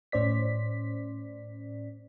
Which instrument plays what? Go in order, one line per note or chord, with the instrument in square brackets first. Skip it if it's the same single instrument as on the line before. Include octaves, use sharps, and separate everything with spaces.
[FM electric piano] A2 C#4 C5 D5 B6